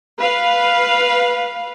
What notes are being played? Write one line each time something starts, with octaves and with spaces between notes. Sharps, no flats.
B4 F5